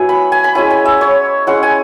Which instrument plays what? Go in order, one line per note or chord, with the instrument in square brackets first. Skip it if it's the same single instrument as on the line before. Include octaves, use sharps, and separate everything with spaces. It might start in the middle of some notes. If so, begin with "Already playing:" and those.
Already playing: [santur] F#3 B3 E4 G#5
B5
G#5
B5
G#3 C#4 E4 G#5
G#5
E5
C#5
G#3 C#4 E4 F#5
G#5